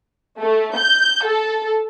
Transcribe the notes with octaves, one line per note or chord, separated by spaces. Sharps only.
A3
G6
A4